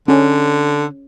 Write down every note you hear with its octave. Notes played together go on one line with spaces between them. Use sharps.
D3 C#4